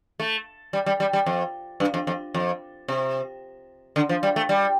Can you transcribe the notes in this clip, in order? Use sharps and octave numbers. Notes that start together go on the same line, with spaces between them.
A3
G3
G3
G3
G3
F2
G2
F2
F2
F2
C3
D3
F3
G3
A3
G3